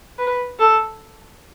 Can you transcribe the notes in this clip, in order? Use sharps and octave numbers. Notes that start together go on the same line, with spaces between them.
B4
A4